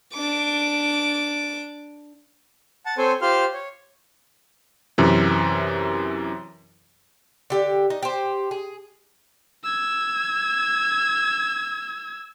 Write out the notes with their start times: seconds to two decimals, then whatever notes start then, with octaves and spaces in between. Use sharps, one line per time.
0.13 D4 D6
2.86 F#5 A5
2.98 C4 A4 C5 C#5 G#5
3.22 F4 G4 C5 C6 F6
3.53 C#5
4.98 F#2 C3 E3
7.50 D3 G4
7.90 D#4
8.03 G4 C5
8.51 G#4
9.64 E6 G#6